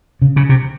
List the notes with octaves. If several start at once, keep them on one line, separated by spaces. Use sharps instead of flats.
C#3
C#3
C3